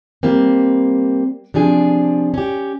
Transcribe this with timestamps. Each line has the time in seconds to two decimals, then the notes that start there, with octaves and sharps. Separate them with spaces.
0.23 G3 A#3 C4
1.54 C3 F3 D4 G#4
2.34 C#4 G4